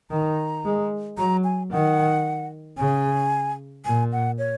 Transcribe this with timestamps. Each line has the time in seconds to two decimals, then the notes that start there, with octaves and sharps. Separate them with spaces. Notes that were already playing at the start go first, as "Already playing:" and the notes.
0.10 D#3 A#5
0.65 G#3
1.18 F#3 A#5
1.44 G#5
1.71 D#3 F#5
2.78 C#3 G#5
3.85 A#2 G#5
4.12 F#5
4.38 C#5